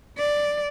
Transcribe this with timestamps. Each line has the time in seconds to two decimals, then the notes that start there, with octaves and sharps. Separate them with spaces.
0.18 D5